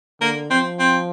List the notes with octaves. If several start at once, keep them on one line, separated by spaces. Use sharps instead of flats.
D3 A#3
F3 C4
C4